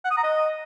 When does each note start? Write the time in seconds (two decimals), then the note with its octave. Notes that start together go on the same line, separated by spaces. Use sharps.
0.05 F#5
0.11 D#6
0.17 A#5
0.24 D#5